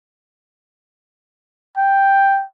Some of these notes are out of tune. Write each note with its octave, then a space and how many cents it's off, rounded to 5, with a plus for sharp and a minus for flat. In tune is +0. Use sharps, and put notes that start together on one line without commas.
G5 +5